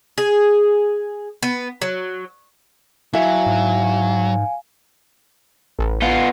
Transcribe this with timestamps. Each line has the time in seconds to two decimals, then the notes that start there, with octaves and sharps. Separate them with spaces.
0.18 G#4
1.43 B3
1.82 F#3
3.14 F#3 E4 E5 F5 G#5
3.46 G#2
5.79 A1
6.02 B3 F4